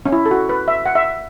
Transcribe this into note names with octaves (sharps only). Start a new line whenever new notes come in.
C#4
E4
A4
F#4
B4
E5
F#5
E5